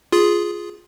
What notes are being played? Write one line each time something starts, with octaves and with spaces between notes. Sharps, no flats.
F4 G#4